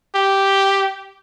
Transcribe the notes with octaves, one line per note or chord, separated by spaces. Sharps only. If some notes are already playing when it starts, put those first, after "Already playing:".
G4